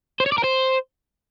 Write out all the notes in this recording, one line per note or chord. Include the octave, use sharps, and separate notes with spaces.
C5
C#5
D5
A#4
C5